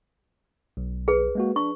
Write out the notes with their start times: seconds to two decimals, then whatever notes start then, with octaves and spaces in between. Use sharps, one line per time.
0.77 B1
1.08 G#4 B4
1.35 G#3 A#3 F#4
1.56 D4 C#6